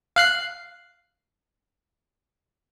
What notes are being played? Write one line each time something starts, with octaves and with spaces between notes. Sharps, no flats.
F5 F#6 C7